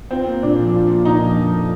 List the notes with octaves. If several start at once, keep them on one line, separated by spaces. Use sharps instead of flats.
C4 F4
A#3
A#2 D4
F3
F4
A#3
A#2 D#4
F3
F2
A3